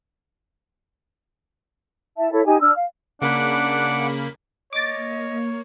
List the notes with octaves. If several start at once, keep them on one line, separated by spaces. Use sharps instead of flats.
E4 E5 A5
E4 A4 C#5
D#4 G4 G#5
D4 E6 F6
F5
C#3 A#3 D4 F#5 B5 D6
A#3 C#5 D#5 D6 A6